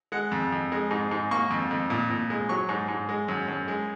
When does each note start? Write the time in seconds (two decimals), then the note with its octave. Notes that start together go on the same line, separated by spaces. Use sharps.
0.12 G#3 F#5
0.32 F2
0.52 F2
0.72 G#3
0.91 G#2
1.11 G#2
1.31 A#3 C#6
1.50 F2
1.71 F2
1.90 A#2
2.10 A#2
2.30 G#3
2.49 F#3 C#6
2.69 G#2
2.88 G#2
3.09 G#3
3.28 F#2
3.48 F#2
3.68 G#3